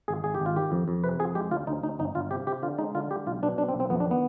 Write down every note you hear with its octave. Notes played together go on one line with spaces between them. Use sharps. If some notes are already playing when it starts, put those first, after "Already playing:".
G#1 G#4
G#1 G#4
G#1 G4
F4
D#3 G4
F2
F2
C3 B4
F2 G#4
G#3 G4
D2 F4
D2 D#4
D2 D#4
G1 D#4
G1 F4
C3 G4
C3 G4
D3 F4
G#3 D#4
D3 F4
G#3 G4
B1 F4
B2 D4
B1 D4
C4
B1
C4
F2 B3
D4
D#3 B3